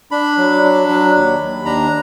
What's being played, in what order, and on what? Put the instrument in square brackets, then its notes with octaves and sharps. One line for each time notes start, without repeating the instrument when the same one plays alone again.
[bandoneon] D4 B5
F#3
D4
F#3
D#2
D#2
D4 A#5